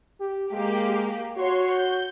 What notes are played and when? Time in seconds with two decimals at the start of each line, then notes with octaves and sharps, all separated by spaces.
0.20 G4
0.52 G#3 A#3 G4
1.37 F#4 C#5 C6
1.71 G6